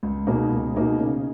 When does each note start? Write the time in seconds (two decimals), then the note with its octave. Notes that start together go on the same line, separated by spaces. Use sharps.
0.03 C#2
0.27 B2 A#3 D#4 G#4
0.51 C#2
0.74 B2 A#3 D#4 G#4
0.99 C#3